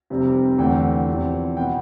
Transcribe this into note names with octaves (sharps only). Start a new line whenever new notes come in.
F1 F2 C3 G3 C4
E2 D3 A3 C4 G5
E2 C3 F3 C4
B2 B3 G5